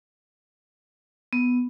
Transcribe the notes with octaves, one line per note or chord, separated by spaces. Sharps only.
B3